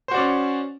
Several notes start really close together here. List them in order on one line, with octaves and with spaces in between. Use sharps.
C5 F#4 D5 C#4